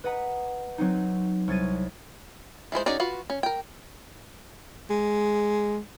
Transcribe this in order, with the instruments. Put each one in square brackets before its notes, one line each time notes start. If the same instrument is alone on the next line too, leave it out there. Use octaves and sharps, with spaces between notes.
[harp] B4 D#5 F#5 A#5
F#3 C4 D#4
C2 C#5 A6 D#7
[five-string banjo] E3 F3 G#3 C5
C#4 D#4 F#4 G#4 D5
F4 F#4 B4
C#4
A#4 G5
[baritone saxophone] G#3